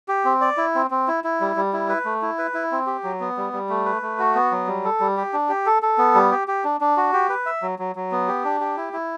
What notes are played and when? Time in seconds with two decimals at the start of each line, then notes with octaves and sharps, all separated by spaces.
0.08 G4
0.25 C4
0.41 D5
0.57 E4
0.75 C4
0.91 C4
1.08 E4
1.24 E4
1.40 G3
1.56 G3
1.73 E4
1.89 B4
2.05 A3
2.22 E4
2.38 B4
2.54 E4
2.72 C4
2.87 G4
3.04 F#3
3.20 B3
3.37 G3
3.53 G3
3.69 A3
3.86 B4
4.02 A3
4.19 F#4
4.35 B3
4.51 F#3
4.67 G3
4.85 A4
5.00 G3
5.17 G4
5.33 D4
5.49 G4
5.66 A4
5.82 A4
5.98 B3
6.15 G3
6.31 G4
6.48 G4
6.64 D4
6.81 D4
6.97 F#4
7.13 G4
7.29 B4
7.46 E5
7.62 F#3
7.79 F#3
7.96 F#3
8.12 B3
8.28 G4
8.44 D4
8.60 G4
8.77 E4
8.93 E4